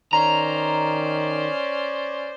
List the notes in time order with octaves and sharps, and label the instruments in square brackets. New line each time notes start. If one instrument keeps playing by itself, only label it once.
[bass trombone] D#3 [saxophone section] C#4 C5 D5 [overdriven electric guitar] A#5